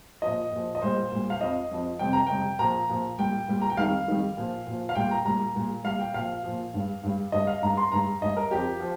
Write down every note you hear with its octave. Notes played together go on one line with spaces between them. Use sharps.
A#2 F3 D#5
A#2 F3
D#5
A#2 G3 C5
A#2 G3
F5
F2 F3 D#5
F2 F3
F2 C3 G3 G5
A#5
F2 C3 G3 G5
A#2 F3 A#5
A#2 F3
A#2 G3 G5
A#2 G3
A#5
G5
F2 D#3 G3 F5
F2 D#3 G3
A#2 F3
A#2 F3
F5
A#2 G3 G5
A#5
A#2 G3 A#5
A#2 G3
A#2 G3 F5
G5
A#2 F3 F5
A#2 F3
G2 G3
G2 G3
G2 G3 D#5
F5
G2 G3 A#5
C6
G2 G3 A#5
G2 G3 D#5
A#4
F2 F3 G4
F3